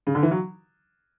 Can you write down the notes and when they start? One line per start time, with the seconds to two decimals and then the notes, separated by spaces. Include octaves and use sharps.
0.07 C#3
0.15 D3
0.23 E3
0.31 F#3